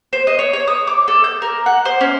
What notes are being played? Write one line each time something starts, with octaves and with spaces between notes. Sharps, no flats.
C5
D#5
C#5
C#5
D#6
D6
A4
G6
A#4
F#5
C5
C#4